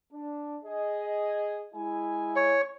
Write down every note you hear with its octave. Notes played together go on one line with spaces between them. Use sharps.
D4
G#4 D#5
G#3 E4 G#5
C#5